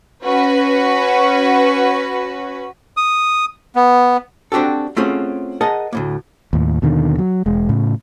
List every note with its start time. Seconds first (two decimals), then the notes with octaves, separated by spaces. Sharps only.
0.24 C#4 F#4 B4
2.97 D#6
3.75 B3
4.52 C4 D4 F#4 G4 A4
4.97 A3 C4 C#4 F4 F#4 G#4
5.61 G#4 A#4 D#5 F#5 A5
5.93 D2 A2 A#3
6.53 D#2 A2
6.82 D#2 B2 D3 D#3
7.19 F#3
7.46 E1 G#3
7.69 A2 C#3